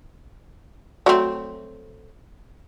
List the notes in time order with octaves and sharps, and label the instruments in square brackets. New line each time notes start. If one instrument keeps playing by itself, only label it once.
[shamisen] F#3 A3 C4